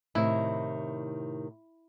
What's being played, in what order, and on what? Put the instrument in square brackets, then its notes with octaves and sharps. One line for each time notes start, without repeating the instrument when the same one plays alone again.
[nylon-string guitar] A2 C3 D#3 [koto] E4